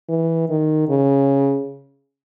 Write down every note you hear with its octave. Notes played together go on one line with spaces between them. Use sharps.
E3
D#3
C#3